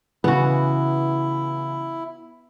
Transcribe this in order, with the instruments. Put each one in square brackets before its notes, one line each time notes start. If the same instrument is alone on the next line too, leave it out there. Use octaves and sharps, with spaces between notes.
[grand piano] C#3 E3 [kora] B3 F#4 [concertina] E4